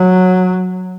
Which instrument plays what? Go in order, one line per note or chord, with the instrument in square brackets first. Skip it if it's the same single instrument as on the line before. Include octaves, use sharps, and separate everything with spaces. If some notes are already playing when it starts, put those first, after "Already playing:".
Already playing: [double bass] F#3